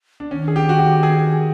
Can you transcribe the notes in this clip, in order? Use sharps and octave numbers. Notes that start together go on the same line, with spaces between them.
D4
D#3 C#4
G#4
G4
F#4
G4
G#4